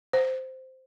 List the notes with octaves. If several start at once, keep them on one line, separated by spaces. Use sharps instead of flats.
C5